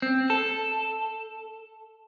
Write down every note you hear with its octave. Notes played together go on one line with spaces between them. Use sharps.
C4
A4